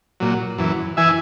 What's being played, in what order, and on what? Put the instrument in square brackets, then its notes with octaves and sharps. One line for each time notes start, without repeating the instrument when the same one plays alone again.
[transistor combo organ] A#2 F#3
F#2 E3
E3 E5 G#5